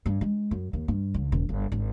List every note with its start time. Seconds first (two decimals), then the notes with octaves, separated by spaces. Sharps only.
0.06 G2
0.21 G#3
0.51 F#2
0.73 D#2
0.88 G2
1.14 C#2
1.32 E1
1.49 G1
1.72 G#1